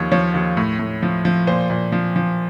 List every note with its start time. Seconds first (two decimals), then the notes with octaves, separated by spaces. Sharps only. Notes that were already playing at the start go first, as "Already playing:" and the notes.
Already playing: D#2 F3 C#5
0.12 F3 C#5
0.34 D#2
0.57 A2
0.79 A2
1.03 F3
1.25 F3
1.47 A#2 C5
1.70 A#2
1.92 F3
2.16 F3